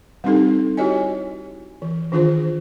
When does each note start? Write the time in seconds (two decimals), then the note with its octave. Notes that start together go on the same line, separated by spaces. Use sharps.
0.24 G3 C4 D4 D#4 G4 A4
0.77 E4 F#4 G4 C#5 D#5 G#5
1.82 E3
2.12 D#3 D4 F4 G#4 C5